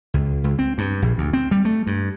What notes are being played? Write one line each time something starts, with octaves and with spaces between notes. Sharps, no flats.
C#2
C#2
C4
G2
A#1
D2
C4
G3
A3
G2